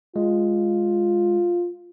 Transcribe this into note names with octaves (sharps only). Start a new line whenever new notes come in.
G#3 F4